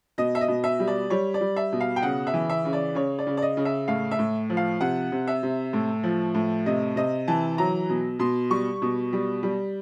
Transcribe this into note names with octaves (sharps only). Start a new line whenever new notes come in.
B2 D#5
E5
D#5
B2
E5
G3
D5
G3 C#5
D5
G3
E5
B2
F5
G5
C#3 F#5
E5
E3
E5
C#3
D5
C#3 C#5
D5
C#3
D5
D#5
C#3
E5
A2 F5
E5
A2
F3
F5
C3 F#5
C3
E5
C3
A2
F3
A2
C3 D#5
C3 D#5
E3 A5
F#3 A#5
B2
B2 C6
G3 C#6
B2
G3
G3